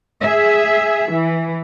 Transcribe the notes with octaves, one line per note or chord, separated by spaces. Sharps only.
G#4 E5
E3